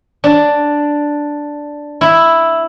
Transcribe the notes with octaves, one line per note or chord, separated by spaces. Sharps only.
D4
E4